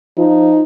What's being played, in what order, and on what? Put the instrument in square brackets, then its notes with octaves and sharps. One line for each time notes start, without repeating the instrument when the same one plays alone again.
[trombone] F3 [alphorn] D#4